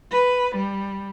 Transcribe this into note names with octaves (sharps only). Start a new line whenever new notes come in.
B4
G3